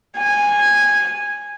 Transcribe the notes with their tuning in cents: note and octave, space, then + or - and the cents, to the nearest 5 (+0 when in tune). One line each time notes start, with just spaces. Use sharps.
G#5 -10